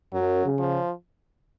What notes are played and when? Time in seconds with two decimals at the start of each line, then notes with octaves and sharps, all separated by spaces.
0.13 F#2 F#3
0.44 C#3
0.59 F3